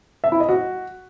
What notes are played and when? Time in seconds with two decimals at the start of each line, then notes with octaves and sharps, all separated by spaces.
0.24 E5
0.32 E4
0.40 D#5
0.49 F#4